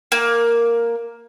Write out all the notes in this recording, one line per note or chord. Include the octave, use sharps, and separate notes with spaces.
A#3